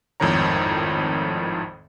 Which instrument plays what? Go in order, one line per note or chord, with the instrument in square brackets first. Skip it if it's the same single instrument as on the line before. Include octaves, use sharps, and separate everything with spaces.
[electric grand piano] G#1 F2 A2 D#3 C#5 A#5